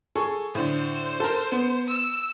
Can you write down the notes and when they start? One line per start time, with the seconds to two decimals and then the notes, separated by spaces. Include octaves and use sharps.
0.15 G#4 A4 C#6
0.55 A2 D3 C5
1.20 A4 A#4
1.52 B3
1.87 E6